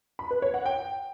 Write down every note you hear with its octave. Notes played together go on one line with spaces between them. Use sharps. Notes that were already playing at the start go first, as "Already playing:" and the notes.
B5
B4
C#5
F#5
G5